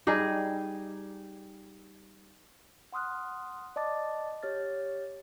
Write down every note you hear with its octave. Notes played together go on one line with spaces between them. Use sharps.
G3 D#4 G#4
F#5 C6 D#6 F6 F#6
D5 D#5 A5 D6 A6
G4 C#5 F6 A6